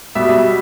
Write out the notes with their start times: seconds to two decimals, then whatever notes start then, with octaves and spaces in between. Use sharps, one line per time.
0.15 B2 G3 E5